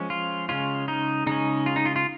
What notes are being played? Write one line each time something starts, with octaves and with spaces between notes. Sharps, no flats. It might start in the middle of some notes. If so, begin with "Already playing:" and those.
Already playing: F3 G#3 C#4
F4
C#3 G#3 C#4 F4
D#4
C#3 G#3 C#4 D#4
F4
D#4
F4
F4